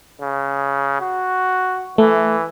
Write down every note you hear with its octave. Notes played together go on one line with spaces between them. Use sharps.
C#3
F#4
E3 A3